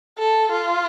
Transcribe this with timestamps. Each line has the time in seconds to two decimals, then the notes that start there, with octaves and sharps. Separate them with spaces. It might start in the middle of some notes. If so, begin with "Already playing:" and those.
0.19 A4
0.52 F4